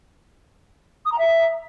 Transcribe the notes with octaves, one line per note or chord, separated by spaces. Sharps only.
D#6
A#5
E5